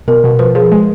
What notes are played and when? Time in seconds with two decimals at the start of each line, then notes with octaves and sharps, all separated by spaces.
0.08 B2 A#4
0.24 B2
0.39 F3 B4
0.55 F3 G#4
0.72 G#3